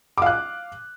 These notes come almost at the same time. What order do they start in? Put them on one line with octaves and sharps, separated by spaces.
D6 F5 F#6